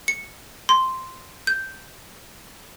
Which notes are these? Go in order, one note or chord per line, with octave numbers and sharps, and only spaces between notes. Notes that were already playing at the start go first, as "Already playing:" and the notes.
C#7
C6
G6